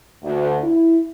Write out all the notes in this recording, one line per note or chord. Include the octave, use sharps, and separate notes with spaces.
D2
E4